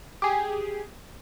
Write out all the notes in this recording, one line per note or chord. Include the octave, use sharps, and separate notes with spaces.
G4 G#4